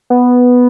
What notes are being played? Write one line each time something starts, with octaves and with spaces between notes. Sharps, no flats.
B3